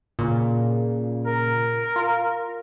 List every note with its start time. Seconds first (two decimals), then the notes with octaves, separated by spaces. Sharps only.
0.19 A#2 C#3
1.26 A#4
1.96 F4